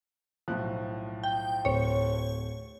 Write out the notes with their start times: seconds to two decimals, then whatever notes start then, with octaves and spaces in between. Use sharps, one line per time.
0.48 B1 A2 F3 F#6
1.23 G5
1.65 D1 C5 C#5